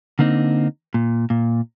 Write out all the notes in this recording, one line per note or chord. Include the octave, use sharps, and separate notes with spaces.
D3 A#3 C4 D#4
A#2
A#2